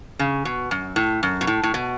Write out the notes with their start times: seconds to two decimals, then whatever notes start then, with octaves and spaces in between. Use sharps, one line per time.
0.19 C#3
0.45 B2
0.71 F#2
0.96 A2
1.23 F#2
1.41 B2
1.47 A2
1.63 A2
1.74 B2